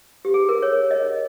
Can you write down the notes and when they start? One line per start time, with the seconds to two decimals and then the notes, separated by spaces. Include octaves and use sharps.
0.25 G4
0.34 G#4
0.49 A#4
0.62 C#5
0.91 D#5